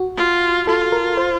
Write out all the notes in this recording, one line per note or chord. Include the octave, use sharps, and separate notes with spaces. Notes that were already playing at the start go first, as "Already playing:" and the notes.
Already playing: F#4
F4
F4 A4
A#4
C5